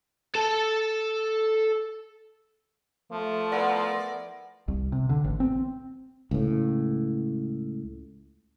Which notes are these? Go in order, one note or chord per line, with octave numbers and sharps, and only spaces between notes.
A4 A5
F3 A3
B3 E4 A#4 D5
C2
C3
D3
A1
C4
C#2 A2